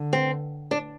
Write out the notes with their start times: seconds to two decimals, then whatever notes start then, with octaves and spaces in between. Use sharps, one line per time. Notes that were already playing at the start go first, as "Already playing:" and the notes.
Already playing: D3
0.13 C4
0.71 D4